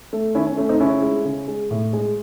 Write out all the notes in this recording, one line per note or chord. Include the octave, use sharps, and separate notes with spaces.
A3
D#3 C#4 E4
C#4
A3 C#4
C4 D#4
C#3 C#4 E4
G#3
C#3
G#3
A2
G#3